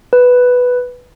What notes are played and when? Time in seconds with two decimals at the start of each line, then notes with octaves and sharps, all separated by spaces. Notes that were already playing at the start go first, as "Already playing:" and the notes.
0.13 B4